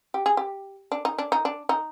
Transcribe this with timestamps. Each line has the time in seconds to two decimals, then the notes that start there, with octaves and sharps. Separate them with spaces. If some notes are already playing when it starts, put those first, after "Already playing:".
0.14 G4
0.26 G#4
0.37 G4
0.92 D4
1.05 D#4
1.18 D4
1.32 D#4
1.45 D4
1.69 D#4